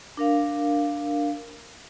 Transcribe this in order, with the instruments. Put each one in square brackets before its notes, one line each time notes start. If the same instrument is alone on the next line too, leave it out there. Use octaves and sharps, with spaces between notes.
[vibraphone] D4 A#4 F5